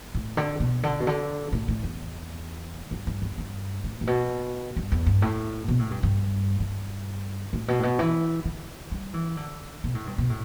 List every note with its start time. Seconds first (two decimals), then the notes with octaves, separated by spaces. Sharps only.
0.15 A2
0.37 D3
0.60 B2
0.83 D3
1.00 B2
1.07 D3
1.52 A2
1.68 A2
1.83 E2
2.91 G2
3.07 G2
3.22 E2
3.38 G2
3.84 A2
4.01 A2
4.07 B2
4.76 G2
4.92 E2
5.06 G2
5.22 A2
5.68 B2
5.79 A2
5.91 G2
6.03 G2
6.60 G2
7.53 A2
7.68 B2
7.79 A2
7.83 B2
7.99 E3
8.45 D3
8.91 G3
9.14 E3
9.37 D3
9.84 B2
9.95 A2
10.07 G2
10.18 B2
10.30 A2